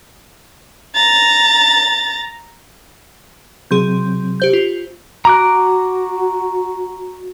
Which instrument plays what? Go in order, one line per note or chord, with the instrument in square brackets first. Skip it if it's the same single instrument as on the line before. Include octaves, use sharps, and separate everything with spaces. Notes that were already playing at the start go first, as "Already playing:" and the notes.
[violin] A#5 A6
[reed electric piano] C3 F#3 C4 [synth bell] G#4 C6 G6
[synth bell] G4 C5 G6
F4
[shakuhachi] F#4 [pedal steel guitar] A#5 D6 F#6